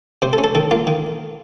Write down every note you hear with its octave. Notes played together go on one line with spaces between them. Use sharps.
C3 C5
A4
C#4
A4
D#3 A4
A#3 F4
D#3